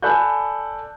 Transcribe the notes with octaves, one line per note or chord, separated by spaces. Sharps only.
A4 D5 G#5 B5 F#6 G6